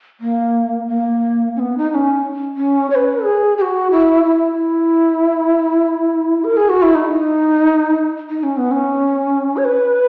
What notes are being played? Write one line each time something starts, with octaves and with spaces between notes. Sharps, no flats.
A#3
A#3
C#4
B3
D#4
D#4
C#4
C#4
C#5
B4
G#4
G#4
F#4
E4
E4
A#4
G#4
F#4
E4
D#4
D#4
C#4
B3
C#4
C#5
B4